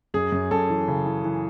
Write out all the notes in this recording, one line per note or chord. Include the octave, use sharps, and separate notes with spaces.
F#2 G#4
F#2
F#2 A4
E3
C#3
E3
E3